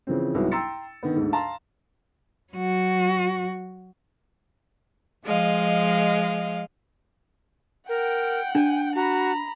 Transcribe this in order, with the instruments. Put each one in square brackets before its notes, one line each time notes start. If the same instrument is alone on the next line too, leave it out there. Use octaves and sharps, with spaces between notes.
[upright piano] C#3 E3 F3 C4
C2 G#2 F#3 B3
G5 A#5 C6 E6 A6 C#7
D3 D#3 B3
D2 G#2
F5 A5 A#5 C6
[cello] F#3 F#4
[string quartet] F3 G#3 D#5 F5
[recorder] A#4 [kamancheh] F#5 G5
[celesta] D4 [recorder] G#5
[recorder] F#4 [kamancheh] A#5 B5